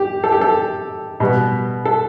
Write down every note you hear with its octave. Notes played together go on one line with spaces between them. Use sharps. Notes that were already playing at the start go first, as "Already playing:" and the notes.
Already playing: G4
A4
G4
A4
B2 G3 B3
A4